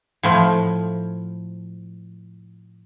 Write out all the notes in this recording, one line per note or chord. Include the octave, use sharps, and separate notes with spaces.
A2 F3